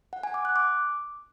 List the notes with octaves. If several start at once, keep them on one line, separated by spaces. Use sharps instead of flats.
F#5
G#5
D6
F#6
D6